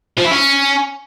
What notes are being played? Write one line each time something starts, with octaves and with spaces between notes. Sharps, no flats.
F3
E4
C#4